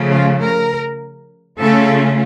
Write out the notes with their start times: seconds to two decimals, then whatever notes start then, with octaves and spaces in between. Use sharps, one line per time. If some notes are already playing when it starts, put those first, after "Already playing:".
Already playing: C#3 F3 A3
0.12 F4
0.42 A#4
1.61 C#3 A3 C#4 F4 A4